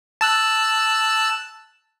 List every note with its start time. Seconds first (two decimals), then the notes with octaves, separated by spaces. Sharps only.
0.21 A5 E6 F#6